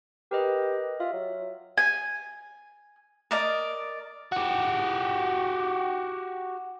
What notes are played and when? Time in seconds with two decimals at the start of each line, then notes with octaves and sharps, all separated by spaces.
0.31 G4 A#4 B4 D#5
1.00 F4 E5
1.13 F#3
1.77 G#5
3.31 A#4 D5 D#5
4.32 F#4 G4